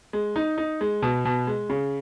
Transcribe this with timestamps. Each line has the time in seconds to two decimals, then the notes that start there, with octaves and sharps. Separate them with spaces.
0.13 G#3
0.36 D#4
0.58 D#4
0.81 G#3
1.02 B2
1.25 B2
1.47 G#3
1.70 C#3